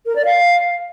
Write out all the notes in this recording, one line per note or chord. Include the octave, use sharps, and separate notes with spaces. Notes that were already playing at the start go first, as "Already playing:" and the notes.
A#4
D5
F5